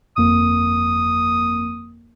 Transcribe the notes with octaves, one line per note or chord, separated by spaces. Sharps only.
G1 F2 A#3 D#6